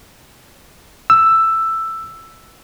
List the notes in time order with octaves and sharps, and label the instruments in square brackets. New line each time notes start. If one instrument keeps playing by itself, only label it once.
[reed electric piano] E6